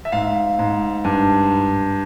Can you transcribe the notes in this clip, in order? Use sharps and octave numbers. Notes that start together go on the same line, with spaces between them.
E5
G#2 F5
G#2
G2